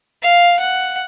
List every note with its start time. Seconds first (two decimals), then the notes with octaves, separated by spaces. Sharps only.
0.22 F5
0.59 F#5